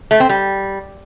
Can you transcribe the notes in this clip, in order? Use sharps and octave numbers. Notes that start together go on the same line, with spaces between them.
A3
C4
G3